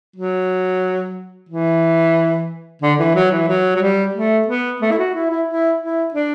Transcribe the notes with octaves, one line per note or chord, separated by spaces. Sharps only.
F#3
E3
D3
E3
F#3
E3
F#3
F#3
G3
A3
B3
A3
E4
F#4
E4
E4
E4
E4
D4